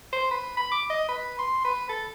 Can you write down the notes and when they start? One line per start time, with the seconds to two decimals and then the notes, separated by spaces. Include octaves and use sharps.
0.13 C5
0.31 B4
0.57 B5
0.72 D6
0.90 D#5
1.09 B4
1.39 C6
1.65 B4
1.89 A4